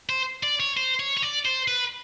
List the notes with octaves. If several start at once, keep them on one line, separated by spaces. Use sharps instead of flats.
C5
D5
C#5
C5
C#5
C#5
D5
C5
B4